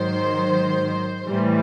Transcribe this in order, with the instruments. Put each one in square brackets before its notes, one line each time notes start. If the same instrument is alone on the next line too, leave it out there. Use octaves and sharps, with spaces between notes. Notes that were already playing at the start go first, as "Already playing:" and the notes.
Already playing: [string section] G#2 D#3 F#3 C5
A2 E3 G3